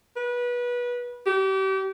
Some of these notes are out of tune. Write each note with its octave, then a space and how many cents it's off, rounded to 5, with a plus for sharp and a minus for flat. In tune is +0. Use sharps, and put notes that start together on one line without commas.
B4 -25
G4 -35